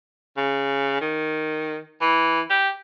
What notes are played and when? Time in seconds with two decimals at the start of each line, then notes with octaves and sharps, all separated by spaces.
0.37 C#3
1.01 D#3
2.01 E3
2.50 G4